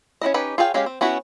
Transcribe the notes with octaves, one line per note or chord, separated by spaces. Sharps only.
C#4 D4 E4 D#5
C#4 D#4 G4 B4
F4 G#4 C#5 F5 G5
G#3 C#4 G4 F5
C4
B3 C#4 E4 F#4